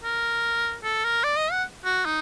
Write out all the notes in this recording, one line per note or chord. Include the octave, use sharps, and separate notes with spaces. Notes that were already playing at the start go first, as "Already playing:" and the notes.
A#4
A4
A#4
D5
D#5
F#5
F#4
D#4